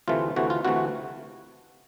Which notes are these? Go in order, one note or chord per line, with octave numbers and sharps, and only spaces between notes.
D2 C3 E3 A3 F4
D2 C3 E3 A3 F#4
F4
D2 C3 E3 A3 F#4